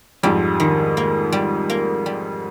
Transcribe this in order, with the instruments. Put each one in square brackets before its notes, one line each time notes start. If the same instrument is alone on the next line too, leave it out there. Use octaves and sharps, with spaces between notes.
[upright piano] F2 G#2 [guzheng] G3
[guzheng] D#3
A#3
G3
A#3
G3